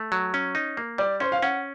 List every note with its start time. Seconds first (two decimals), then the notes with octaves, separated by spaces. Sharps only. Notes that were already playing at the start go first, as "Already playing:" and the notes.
Already playing: A3
0.12 F#3
0.34 C#4
0.55 D#4
0.77 A#3
0.98 G3 D5
1.20 C#4 C5
1.32 F5
1.42 C#4 F#5